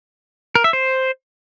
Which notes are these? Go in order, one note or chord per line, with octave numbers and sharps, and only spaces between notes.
A#4
E5
C5